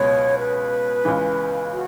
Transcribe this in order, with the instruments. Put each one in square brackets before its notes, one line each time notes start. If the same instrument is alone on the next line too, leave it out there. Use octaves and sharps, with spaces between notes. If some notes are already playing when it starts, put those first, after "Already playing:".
Already playing: [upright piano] C#2 B2 F#3 [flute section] C#5
[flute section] B4
[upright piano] C#2 C#3 E3
[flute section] F#4